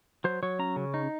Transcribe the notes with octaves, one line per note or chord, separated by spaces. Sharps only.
F#3 C5
F#3 C#5
C#4 A#5
C#3
D#4